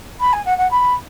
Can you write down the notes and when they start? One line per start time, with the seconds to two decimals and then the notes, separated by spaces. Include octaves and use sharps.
0.20 B5
0.32 G#5
0.45 F#5
0.58 F#5
0.71 B5